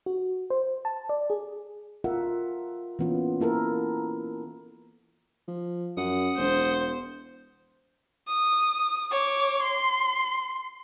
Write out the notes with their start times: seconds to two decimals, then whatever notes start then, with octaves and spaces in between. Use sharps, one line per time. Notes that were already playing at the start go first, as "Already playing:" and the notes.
0.06 F#4
0.50 C5
0.85 A5
1.09 D5
1.30 G#4
2.04 F4 A4 A#4 E5 F#5
2.99 E3 A#3 B3 C#4 F4
3.40 A#3 E4 A4 A#4
5.48 F3
5.97 F#2 F#5 D#6
6.38 E1 C5
8.27 D#6
9.11 C#5 D6
9.62 C6